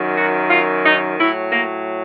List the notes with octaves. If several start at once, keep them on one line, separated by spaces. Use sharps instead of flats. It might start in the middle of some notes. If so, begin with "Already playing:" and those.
Already playing: F#2 D#3 F#3
F#4
F4
D#4
A2 F#3 E4
A#3